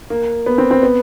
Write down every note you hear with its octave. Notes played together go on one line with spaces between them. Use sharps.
A#3
B3
C4
C4
B3